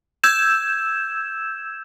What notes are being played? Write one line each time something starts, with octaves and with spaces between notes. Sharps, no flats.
E6 G6 G#6 E7